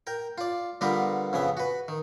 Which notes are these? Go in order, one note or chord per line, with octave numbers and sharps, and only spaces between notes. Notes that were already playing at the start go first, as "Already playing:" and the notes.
A#4 G5
F4 D5
D3 G3 B3 F4 A#4 B4
F2 C#3 B3 E5
F#4 B4
D#3